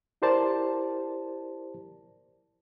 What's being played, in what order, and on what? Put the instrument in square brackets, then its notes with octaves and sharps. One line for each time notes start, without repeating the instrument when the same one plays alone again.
[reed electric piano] E4 G4 A#4 C5 D5 A5